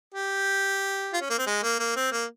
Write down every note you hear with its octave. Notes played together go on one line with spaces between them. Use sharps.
G4
F4
C#4
A#3
C4
G#3
A#3
A#3
C4
A#3